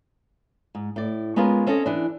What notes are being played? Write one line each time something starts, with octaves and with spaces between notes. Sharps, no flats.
G#2
A2 D5
G#3 B3 C#4 F4 G#4 A#4
C4 C#4 E4 A4 C#5 D#5
E3 D4